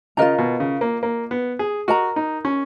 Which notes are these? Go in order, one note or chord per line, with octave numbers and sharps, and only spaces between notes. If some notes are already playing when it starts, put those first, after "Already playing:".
C#3 F4 A#4 D#5 A#5
B2
C#3
A#3
A#3
B3
G#4
F#4 A#4 D#5 A#5
D#4
C#4